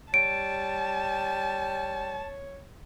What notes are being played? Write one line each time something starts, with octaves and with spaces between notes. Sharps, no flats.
G3 C#5 A5 D7